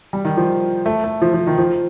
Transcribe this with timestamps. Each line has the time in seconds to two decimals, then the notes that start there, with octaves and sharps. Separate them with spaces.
0.13 G3
0.25 D#3
0.37 F3
0.86 A3
1.04 A3
1.22 F3
1.34 F3
1.47 D#3
1.58 F3